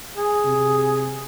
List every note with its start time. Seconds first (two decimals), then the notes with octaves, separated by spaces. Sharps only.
0.16 G#4
0.45 C3